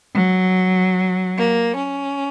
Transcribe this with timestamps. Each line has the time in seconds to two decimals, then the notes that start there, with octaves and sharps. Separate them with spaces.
0.15 F#3
1.37 A#3
1.77 C#4